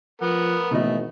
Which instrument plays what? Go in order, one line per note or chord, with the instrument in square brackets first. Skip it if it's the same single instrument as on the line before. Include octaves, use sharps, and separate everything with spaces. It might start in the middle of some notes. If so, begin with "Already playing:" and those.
[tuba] F3 [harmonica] B3 A#4 [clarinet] F#5
[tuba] G#1 [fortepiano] B2 E3 D#5 [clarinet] A3